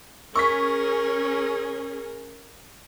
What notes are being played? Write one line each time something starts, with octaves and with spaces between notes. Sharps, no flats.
C#4 G#4 A#4 C#6 B6